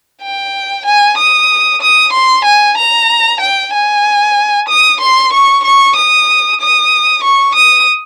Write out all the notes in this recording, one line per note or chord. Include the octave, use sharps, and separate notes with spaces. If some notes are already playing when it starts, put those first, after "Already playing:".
G5
G#5
D#6
D#6
C6
G#5
A#5
G5
G#5
D#6
C6
C#6
C#6
D#6
D#6
C#6
D#6